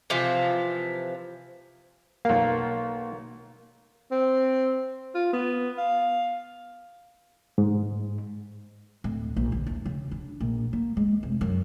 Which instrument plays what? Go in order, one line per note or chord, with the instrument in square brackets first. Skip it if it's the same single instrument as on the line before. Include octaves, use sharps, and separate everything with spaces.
[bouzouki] C3 E3 F3
[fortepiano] B1 F5 [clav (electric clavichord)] A#3
[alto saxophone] C4
F4
B3
F5
[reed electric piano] G#2
[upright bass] D1
A#1
D3
E2
C#3
D4
A#1
A#3
G#3
F1
F#2